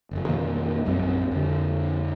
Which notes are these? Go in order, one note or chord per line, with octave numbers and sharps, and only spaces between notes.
F#1 F2
F2 B2 D#3 A#3
A#1 F#2 D#3 C4
F2 D3